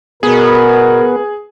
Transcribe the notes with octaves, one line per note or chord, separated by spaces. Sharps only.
B2 B3 G#4 A#4